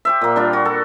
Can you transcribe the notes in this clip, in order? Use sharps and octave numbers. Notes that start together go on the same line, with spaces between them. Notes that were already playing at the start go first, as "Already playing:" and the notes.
G4 C5 E5
A#2 A#3
G3 D4 F4
F#4
A4